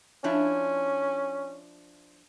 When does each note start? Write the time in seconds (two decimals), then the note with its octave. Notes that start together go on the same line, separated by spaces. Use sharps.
0.24 F3 C#4 D4 E4